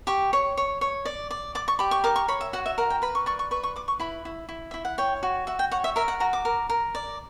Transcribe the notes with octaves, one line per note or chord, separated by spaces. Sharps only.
G4 C#6
C#5
C#5
C#5
D5
D5
D5 D6
C#6
G4 B5
C#6
A#4 D6
C#6
C#5 B5
E5
F#4 F#5
E5
A#4 F#5
G5
B4 B5
C#6
D5 C#6
C#6
B4 C#6
C#6
B4 D6
C#6
E4 B5
E4
E4
E4 E5
F#5
C#5 G5
F#4
F#4 E5
G5
C#5 F#5
E5
A#4 E5
F#5
F#4 A#5
D6
A#4
A#4
D5